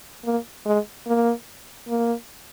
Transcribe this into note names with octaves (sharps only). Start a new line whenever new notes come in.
A#3
G#3
A#3
A#3